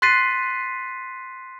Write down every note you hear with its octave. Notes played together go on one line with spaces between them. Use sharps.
C6 F#6 A6 B6 C7 D#7